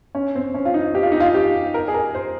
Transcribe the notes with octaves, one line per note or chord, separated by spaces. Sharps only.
C#4
C4
C#4
F4
D#4
G4
F4
D#4
F4
G4
A#4
G#4
A#4
C5